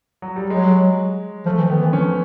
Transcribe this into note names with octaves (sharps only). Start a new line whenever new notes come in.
F#3
G3
F#3 G#3
F3 A3
E3
D#3 B3
E3
F3 C#4